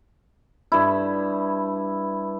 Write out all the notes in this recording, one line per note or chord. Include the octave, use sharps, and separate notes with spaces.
G2 E4